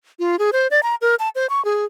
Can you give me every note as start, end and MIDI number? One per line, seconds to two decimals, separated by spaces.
0.19 0.36 65
0.39 0.50 68
0.53 0.67 72
0.71 0.81 74
0.83 0.95 82
1.01 1.15 70
1.19 1.29 81
1.35 1.47 72
1.50 1.63 85
1.65 1.85 68